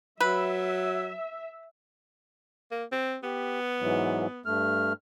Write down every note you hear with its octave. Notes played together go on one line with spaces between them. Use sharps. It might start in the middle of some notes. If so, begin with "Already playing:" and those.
F#3 B4 E5
A#3
C4
B3 G4
G#2 E3 F#3
G2 A3 F6